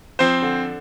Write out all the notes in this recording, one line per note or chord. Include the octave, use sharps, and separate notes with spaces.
F3 C4 C5
D3